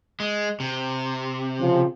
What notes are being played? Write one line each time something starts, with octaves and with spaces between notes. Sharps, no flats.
G#3
C3
C#3 F3